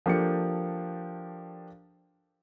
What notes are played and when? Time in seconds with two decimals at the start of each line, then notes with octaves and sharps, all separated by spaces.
0.06 F3 A#3 D4 G4 A4 C#7